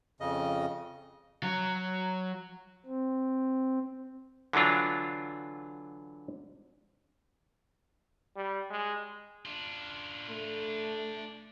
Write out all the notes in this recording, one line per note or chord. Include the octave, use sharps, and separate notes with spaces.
F2 C#3 D#5
F#3
C4
D3 E3 F#3 D4 F4
G3
G#3
D4 F4
A3